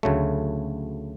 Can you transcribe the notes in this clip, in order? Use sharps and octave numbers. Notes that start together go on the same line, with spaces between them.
D2 C#3 F#3 A3